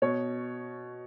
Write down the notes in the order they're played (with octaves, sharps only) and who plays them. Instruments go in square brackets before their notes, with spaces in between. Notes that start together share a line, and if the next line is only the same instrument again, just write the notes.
[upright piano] B2 C#5